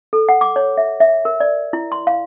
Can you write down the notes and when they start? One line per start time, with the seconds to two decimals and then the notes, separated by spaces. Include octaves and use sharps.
0.13 A4
0.29 F#5
0.41 D6
0.56 C#5
0.77 E5
1.00 E5
1.25 A#4
1.40 D5
1.73 E4
1.92 C6
2.07 F5